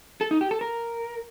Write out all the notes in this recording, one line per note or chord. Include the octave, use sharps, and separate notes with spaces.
A4
D#4
G4
A4
A#4